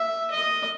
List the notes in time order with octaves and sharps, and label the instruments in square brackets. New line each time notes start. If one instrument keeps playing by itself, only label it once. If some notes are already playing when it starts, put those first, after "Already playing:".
Already playing: [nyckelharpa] E5
D#5